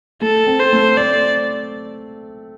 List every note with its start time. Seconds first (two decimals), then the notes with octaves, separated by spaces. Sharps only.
0.22 A3 A4
0.47 C4
0.59 C5
0.73 A3
0.97 A3 D5